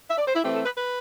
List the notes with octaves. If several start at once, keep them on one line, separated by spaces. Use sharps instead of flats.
E5
D5
C5
E4
E3 A3 C4 G4
A4
B4
B4